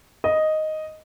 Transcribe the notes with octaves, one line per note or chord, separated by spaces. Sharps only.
D#5